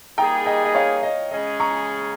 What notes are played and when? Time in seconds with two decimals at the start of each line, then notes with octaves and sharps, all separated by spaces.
0.17 G3 A#3 D#4 G#4 G5 A#5
0.46 D#5 G5
0.64 D#5
0.75 C#5 F5
1.03 D#5
1.31 C#3 G#3 C#4 G#4 D#5
1.60 A#5 C#6